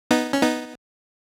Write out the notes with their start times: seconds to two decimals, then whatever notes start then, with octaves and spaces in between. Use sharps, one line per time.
0.11 B3 D#4
0.33 C#4
0.42 B3 D#4